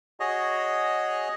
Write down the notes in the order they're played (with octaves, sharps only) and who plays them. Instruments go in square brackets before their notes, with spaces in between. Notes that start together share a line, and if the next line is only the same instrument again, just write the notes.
[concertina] F#4 G#4 C#5 D#5